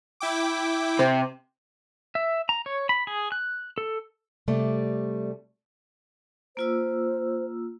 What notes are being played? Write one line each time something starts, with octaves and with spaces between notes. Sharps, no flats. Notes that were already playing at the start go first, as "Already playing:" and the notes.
E4 G5 D6
C3 C5
E5
A#5
C#5
B5
G#4
F#6
A4
C3 G3 A3 D5
A#3 F4 C5 E6